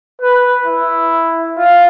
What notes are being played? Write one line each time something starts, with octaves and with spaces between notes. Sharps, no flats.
B4
E4
F4